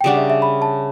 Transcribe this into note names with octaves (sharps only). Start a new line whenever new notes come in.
G5
C#3 G3 D4 F#5
E5
E5
B5
A5